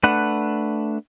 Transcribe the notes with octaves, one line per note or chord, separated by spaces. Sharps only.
A3 D4 B4 F#5